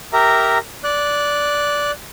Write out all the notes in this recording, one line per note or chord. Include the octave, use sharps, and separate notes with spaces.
G4 A#4 E5 A#5
D5 F#6